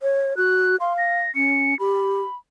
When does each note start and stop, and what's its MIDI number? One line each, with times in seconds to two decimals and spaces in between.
0.02 0.36 73
0.37 0.76 66
0.37 0.76 90
0.80 1.20 77
0.80 0.93 84
0.98 1.33 94
1.35 1.74 61
1.35 1.78 97
1.79 2.21 67
1.79 2.35 83